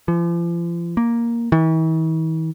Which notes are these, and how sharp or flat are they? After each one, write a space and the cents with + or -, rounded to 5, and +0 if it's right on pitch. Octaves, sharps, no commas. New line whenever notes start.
F3 -40
A#3 +5
E3 -45